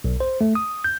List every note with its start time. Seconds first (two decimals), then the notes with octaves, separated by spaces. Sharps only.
0.04 B1
0.20 C5
0.41 A3
0.55 D#6
0.84 G6